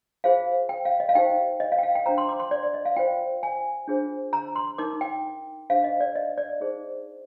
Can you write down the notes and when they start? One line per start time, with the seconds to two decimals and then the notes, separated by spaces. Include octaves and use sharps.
0.24 F4 G#4 C5 F5
0.69 G5
0.85 F5
1.00 D#5
1.09 F5
1.15 D#4 G4 C5 G5
1.60 D#5
1.72 F5
1.79 G5
1.83 F5
1.95 G5
2.06 D4 F4 C5 A#5
2.18 C6
2.29 D6
2.40 C6
2.51 D5
2.63 D5
2.74 D#5
2.85 F5
2.97 F4 C5 G5
3.43 G#5
3.88 D4 F4 G#4 C5
4.33 A#5
4.56 C6
4.78 D#4 A#4 D6
5.01 G5
5.70 D4 G#4 C5 F5
5.84 D#5
6.00 D5
6.16 D#5
6.37 D5
6.61 D#4 G#4 C5